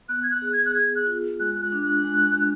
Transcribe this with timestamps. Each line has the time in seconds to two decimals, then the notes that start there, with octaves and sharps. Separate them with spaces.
0.09 B3 F#6
0.23 G#6
0.31 F#6
0.42 G#4
0.53 G#6
0.66 F#6
0.74 G#4 G#6
0.96 F#6
1.06 F4
1.40 G#3 F#6
1.62 F#6
1.72 D4
1.83 F#6
2.04 G#3
2.38 D4